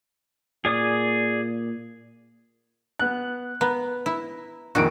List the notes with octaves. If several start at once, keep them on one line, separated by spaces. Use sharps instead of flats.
A#2 G#4 D5 D#6
B3 F#6
B3 A#5
E4
A#1 F2 D#3 F#4 D7